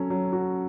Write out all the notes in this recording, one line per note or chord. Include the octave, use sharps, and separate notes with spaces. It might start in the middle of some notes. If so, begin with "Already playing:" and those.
Already playing: F#3 C#4 A4
F#3
F#4